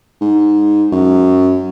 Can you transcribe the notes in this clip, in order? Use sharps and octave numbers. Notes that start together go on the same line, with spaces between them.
G#2
F#2